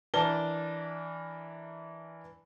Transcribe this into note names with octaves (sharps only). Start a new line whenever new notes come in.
E3 D4 A#4 A5 G7